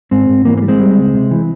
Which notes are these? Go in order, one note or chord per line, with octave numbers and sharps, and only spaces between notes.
G#2 G#3 C4
G#2
E3 A#3
A#3
G3
G#3 C4
G3
C#2
C3
E3